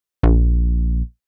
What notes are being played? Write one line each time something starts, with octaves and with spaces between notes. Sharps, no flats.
A#1